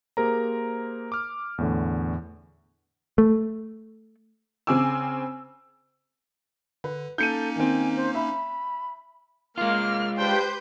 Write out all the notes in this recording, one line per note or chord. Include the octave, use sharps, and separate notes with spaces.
A#3 G4 G#4 A#4 C5 A#5
D6 F6
E2 A2 D3
A3
C#3 C4 G#5 D6 E6
D3 B4
A#3 C#4 D#4 A4 G6 C#7 D#7
D#3 C4 G#5
C5
E5 B5
G#3 A#3 F4 F6
G3 D4 G4 B4 C5 G5 G6